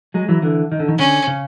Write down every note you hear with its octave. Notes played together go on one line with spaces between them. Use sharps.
F#3 G#3
E3 F#3
D3 E3
D#3
D3
D#3
D3 C#4
C#3